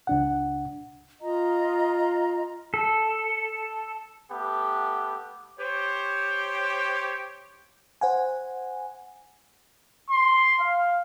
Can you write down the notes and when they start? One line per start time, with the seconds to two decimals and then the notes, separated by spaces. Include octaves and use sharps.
0.07 C#2 D4 F#5
1.20 F4 D#5 A#5
2.74 A4
4.32 A3 B3 G4
5.57 G4 C5 C#5
8.01 C5 F#5 G#5
10.10 C6
10.60 F5